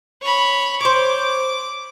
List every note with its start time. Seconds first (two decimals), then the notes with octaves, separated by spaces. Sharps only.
0.22 C#5 B5
0.81 C5 C#5 D6